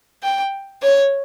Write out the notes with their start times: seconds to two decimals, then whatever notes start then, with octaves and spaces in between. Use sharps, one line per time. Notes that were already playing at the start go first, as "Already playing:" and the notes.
0.23 G5
0.82 C#5